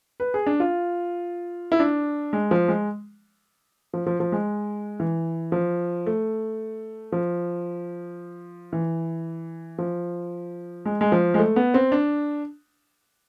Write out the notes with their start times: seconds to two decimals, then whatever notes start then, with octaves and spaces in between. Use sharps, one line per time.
0.20 B4
0.34 G#4
0.46 D4
0.60 F4
1.72 E4
1.80 D4
2.33 G#3
2.51 F3
2.68 G#3
3.94 F3
4.06 F3
4.20 F3
4.32 G#3
5.00 E3
5.52 F3
6.06 A3
7.12 F3
8.73 E3
9.78 F3
10.86 G#3
11.01 G#3
11.12 F3
11.34 G#3
11.38 A3
11.56 B3
11.74 C4
11.92 D4